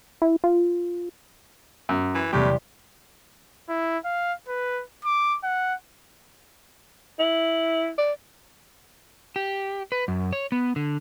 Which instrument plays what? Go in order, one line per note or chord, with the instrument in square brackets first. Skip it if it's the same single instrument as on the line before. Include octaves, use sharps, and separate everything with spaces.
[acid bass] E4
F4
[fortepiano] F#2
[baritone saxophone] E3
[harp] E2 C3 G3 [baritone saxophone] A2 [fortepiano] G4
[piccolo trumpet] E4
F5
B4
D6
F#5
[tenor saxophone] E4
D5
[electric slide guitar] G4
B4
F#2
C#5
B3
D3